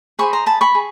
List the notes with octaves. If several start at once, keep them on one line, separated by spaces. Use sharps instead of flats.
G#4 C5 D#5 B5 C#6
A#5 C6
A5 B5
B5 C#6
G#4